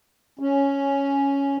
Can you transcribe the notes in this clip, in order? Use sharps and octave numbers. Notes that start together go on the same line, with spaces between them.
C#4